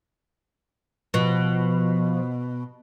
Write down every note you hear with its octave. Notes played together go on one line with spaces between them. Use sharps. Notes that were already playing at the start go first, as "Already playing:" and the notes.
B2 F3